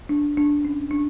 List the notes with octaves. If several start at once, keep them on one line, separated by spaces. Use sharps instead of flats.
D4
D4
C#4
D4